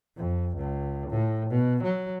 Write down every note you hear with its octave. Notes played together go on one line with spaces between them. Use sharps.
F2
C#2
A2
B2
F#3